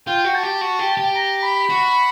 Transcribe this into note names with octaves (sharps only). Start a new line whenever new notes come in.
F4 G5
F#4
A5
G4
F#4
G4
G4
A#5
B5
F#4